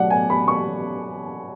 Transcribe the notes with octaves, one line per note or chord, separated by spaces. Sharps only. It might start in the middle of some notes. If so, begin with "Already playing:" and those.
Already playing: B2 F#3 A3 D5 F#5
G#5
B5
C#6